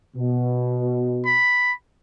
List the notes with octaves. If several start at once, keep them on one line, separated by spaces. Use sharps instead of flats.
B2
B5